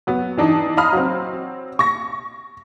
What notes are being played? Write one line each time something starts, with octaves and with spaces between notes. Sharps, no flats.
F#3 B3
E3 D4 D#4
D#5 F5 A#5 B5 D#6 F6
F#3 C4
C#6 A#6